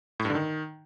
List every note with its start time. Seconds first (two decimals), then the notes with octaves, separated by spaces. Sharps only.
0.20 A2
0.25 G2
0.30 D3
0.35 D#3